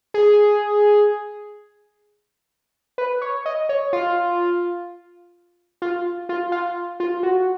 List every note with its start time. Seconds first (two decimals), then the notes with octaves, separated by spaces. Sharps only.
0.14 G#4
2.98 B4
3.22 C#5
3.46 D#5
3.69 C#5
3.93 F4
5.82 F4
6.29 F4
6.52 F4
7.00 F4
7.23 F#4